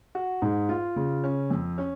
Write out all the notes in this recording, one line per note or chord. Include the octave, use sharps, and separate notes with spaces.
F#4
G#2
F4
C#3
C#4
F2
C#4